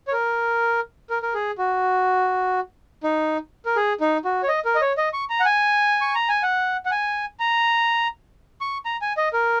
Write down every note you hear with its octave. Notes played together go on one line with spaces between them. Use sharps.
C#5
A#4
A#4
A#4
G#4
F#4
D#4
A#4
G#4
D#4
F#4
C#5
D#5
A#4
D#5
C#5
D#5
C#6
A#5
F#5
G#5
C#6
A#5
G#5
F#5
F#5
G#5
A#5
C#6
A#5
G#5
D#5
A#4